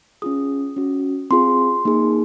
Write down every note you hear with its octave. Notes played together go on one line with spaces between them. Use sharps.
C#4 F4 G#4 D#6
C#4 F#4
C4 F4 G#4 C6
A#3 D#4 G#4